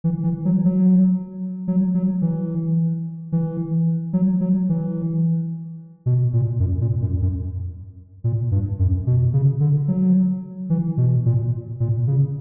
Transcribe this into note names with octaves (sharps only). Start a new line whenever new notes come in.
E3
E3
F#3
F#3
F#3
F#3
E3
E3
F#3
F#3
E3
B2
A#2
F#2
A#2
F#2
F#2
A#2
G2
F#2
B2
C#3
D3
F#3
E3
B2
A#2
A#2
C#3